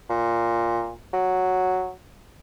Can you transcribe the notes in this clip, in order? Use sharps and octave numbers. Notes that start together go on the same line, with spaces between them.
A#2
F#3